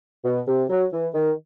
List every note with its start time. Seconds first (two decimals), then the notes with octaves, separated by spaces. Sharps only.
0.25 B2
0.47 C3
0.69 F#3
0.92 E3
1.14 D#3